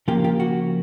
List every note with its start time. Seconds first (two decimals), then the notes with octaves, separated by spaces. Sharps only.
0.08 C#3 F3 A#3 F4 G4
0.24 F4 G4
0.40 F#4